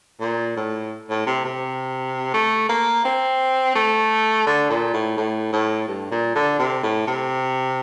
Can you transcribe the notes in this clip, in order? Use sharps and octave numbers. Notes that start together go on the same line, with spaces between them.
A#2
A2
A2
C3
C3
A3
A#3
C4
A3
D3
A#2
A2
A2
A2
G2
A#2
D3
C3
A2
C3